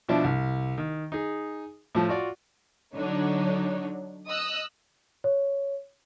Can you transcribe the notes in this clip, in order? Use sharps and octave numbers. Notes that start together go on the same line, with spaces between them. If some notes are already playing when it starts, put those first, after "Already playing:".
B2 F3 D4 E4
C2
D#3
D#4 G#4
A2 F3
F4 F#4 D5
D3 F#3 D4 D#4 C#5
D#5 D#6 E6 F#6
C#5